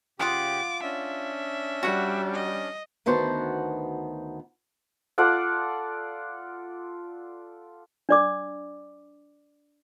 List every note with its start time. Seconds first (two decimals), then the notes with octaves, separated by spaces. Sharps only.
0.19 C#3 F4 G4 F#5 D6 D#6
0.83 C#4 D4 E5
1.83 G3 F#4 F#5
2.33 D#5
3.06 D2 D#3 B3 F#4 C5 A5
5.18 F4 A4 D5 F#5
8.09 D4 D5 D6